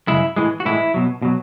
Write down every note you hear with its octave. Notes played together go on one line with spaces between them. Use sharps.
F#2 C#3 G#3 E4
A2 E3 G#3
F#4
A2 E3 G#3 E4
B2 F#3
B2 F#3